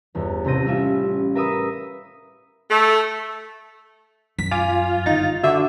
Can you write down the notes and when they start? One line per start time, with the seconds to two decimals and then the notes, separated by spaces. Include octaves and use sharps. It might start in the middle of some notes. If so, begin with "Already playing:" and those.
0.15 G1 E2
0.44 A1 C3 E4 G6 A#6 D#7
0.65 G3 C#4 E4 F4 E5 G5
1.35 A#4 B4 E5 B5 D#6
2.70 A3
4.38 F#2 B6
4.51 F4 G#5 D6
5.06 G1 D#4 E4 A6
5.43 D3 F#4 E5